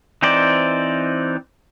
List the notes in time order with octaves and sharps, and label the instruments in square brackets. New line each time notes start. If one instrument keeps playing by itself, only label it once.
[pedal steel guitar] E3 C4 D#4 C5 D5